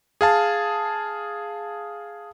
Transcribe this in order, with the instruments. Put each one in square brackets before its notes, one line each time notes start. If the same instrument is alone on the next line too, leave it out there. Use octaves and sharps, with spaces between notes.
[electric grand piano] G#4 F5 A5